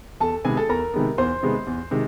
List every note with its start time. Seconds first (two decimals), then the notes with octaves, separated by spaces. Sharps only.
0.20 E2 A4 A5
0.45 C3 D#3 G#3 B3 G#4 G#5
0.57 A4 A5
0.69 E2 A#4 A#5
0.94 C3 D#3 G#3 B3
1.18 E2 C5 C6
1.43 C3 D#3 G#3 B3
1.67 E2
1.91 C3 D#3 G#3